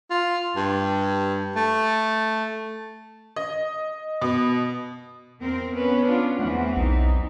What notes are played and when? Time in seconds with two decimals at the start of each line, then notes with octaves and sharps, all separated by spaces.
0.11 F4
0.56 G2
1.56 A3
3.36 D#5
4.22 B2
5.41 E2 C4 A#4
5.76 B3 C#4 B4
6.06 D4 F4
6.39 E2 E3 A3 C4 F#5
6.76 B1 D#4